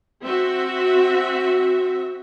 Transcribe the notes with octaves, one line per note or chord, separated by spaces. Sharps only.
C4 F#4 E5